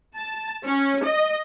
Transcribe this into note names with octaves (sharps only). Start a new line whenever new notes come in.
A5
C#4
D#5